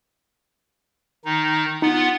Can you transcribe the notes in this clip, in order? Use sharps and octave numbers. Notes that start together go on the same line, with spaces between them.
D#3 D#4
B3 D#4 F4 F#5